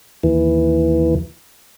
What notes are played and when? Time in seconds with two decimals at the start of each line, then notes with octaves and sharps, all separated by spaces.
0.23 D#2 E3